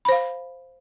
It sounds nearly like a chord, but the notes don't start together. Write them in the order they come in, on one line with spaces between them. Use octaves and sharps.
B5 C5 F5